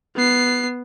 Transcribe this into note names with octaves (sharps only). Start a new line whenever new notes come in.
B3 C7